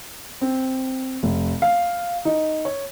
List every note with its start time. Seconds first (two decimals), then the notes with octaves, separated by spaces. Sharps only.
0.41 C4
1.23 F1
1.62 F5
2.25 D#4
2.65 C#5